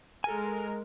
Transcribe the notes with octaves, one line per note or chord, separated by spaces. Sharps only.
G#3 A4 A#4 G#5